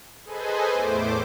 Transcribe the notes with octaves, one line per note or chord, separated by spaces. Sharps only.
G#4 A4 B4 C5 D#5 G#5
E2 A2 A3 C5 D6